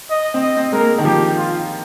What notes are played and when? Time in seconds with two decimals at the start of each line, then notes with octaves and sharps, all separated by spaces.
0.10 D#5
0.34 C4
0.42 D#5
0.57 C4
0.72 G#3 A#4
0.81 A#3
0.98 D#3
1.05 F3 G4
1.37 F4